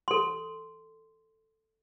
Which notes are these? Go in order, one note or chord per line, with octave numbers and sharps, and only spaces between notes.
A4 C6